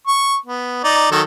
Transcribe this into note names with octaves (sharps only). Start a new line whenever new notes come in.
C#6
B3
D#4 D5
D#3 F#3 A4